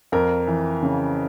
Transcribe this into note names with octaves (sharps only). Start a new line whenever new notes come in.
F2 A#4
E3
C#3